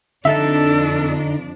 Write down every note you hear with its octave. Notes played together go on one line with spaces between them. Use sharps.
F2 D3 D4 D#4 A4 E5